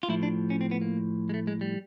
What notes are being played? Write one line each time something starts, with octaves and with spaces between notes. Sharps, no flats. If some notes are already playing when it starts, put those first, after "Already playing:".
F4
A2 F3 E4
D4
C#4
C4
B3
A#3
G#3
A3
G#3
G3